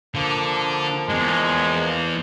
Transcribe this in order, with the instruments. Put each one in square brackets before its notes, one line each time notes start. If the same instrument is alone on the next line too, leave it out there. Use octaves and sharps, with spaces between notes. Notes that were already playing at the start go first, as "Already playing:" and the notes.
[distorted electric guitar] D3 [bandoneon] F3 A#3
[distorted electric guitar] E2 G#2 [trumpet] G#3